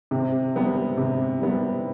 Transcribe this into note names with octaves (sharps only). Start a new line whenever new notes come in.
C3
G3 B3
C3
G3 B3